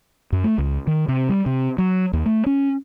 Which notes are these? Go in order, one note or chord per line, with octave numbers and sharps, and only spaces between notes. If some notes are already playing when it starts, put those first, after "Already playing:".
F#2
A3
C#2
D#3
C3
G3
C3
F#3
D#2
A3
C#4